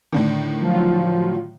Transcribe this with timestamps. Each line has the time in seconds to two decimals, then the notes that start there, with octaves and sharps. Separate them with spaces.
0.13 A2 D3 D#3
0.62 F3 F#3 F4